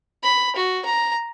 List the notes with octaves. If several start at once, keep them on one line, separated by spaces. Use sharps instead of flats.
B5
F#4
A#5